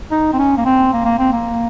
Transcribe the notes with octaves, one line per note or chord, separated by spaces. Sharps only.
D#4
C4
C#4
A#3
C4
A#3
A#3
C4
A#3